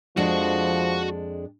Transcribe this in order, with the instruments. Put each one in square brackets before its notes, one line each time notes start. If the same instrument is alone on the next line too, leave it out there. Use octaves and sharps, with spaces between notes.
[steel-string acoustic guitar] F2 G#3 D4 [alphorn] F3 [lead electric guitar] F#4 F#5